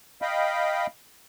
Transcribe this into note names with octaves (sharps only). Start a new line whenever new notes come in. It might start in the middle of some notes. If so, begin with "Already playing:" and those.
D#5 F5 G5 B5